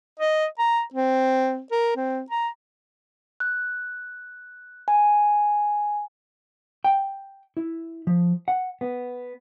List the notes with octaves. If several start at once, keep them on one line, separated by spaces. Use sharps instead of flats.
D#5
A#5
C4
A#4
C4
A#5
F#6
G#5
G5
E4
F3
F#5
B3